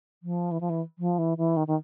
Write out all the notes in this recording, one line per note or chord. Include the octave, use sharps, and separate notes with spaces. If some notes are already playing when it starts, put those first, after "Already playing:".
F3
E3
F3
E3
F3
E3
E3
D#3
D#3